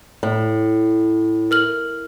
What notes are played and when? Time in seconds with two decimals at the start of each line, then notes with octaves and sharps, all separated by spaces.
0.23 A2
1.51 A#4 F6 F#7